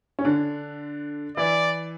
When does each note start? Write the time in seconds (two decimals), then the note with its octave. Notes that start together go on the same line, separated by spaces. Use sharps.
0.19 C#4
0.25 D3 D4
1.37 E3 E4 D5